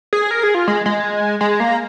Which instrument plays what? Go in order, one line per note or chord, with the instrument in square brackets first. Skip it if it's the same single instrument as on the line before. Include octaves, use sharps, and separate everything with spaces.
[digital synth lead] G#4
A#4
G#4
F4
G#3
G#3
G#3
A#3